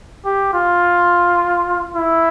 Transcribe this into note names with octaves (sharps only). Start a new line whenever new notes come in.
G4
F4
E4